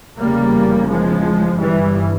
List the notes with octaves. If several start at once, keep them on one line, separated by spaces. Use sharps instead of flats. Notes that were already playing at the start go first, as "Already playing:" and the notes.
F1 E2 C#3 G3 A#3
F3 G#3
G1 G2 E3 G3